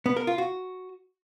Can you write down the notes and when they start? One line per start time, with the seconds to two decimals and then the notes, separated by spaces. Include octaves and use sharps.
0.06 B3
0.16 A#4
0.27 F4
0.38 F#4